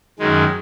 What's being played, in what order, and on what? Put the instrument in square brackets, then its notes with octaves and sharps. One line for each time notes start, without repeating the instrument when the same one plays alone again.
[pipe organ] F#2 D#3 G#3